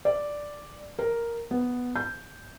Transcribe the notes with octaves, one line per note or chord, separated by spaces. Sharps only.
D5
A#4
B3
G6